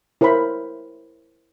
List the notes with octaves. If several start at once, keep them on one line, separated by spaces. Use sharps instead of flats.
E4 A#4 C5 C#5 B5